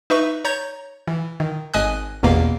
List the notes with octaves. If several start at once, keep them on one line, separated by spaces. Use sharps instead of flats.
D#4 B4 E5 C#6
C#5 A#5 G6 G#6
E3
D#3
G#1 D#5 G#5 D#6 F#6
A1 E2 B2 A#3 F5